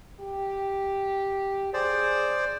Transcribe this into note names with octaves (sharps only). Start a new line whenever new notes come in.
G4
G#4 C5 D5